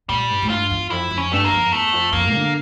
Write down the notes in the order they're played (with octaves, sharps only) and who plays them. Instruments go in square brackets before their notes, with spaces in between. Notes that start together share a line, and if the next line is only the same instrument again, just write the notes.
[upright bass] A#2 [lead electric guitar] G3
[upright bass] G2
A2
[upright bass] G2 [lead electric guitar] F4
[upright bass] E2
[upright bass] F2 [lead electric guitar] E4
[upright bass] F2
[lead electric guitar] C#4
[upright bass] G2 [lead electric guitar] A3
[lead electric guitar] A#3
[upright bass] F2
[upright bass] E2 [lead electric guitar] A3
[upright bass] F2
[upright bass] F2 [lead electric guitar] A#3
[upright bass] D3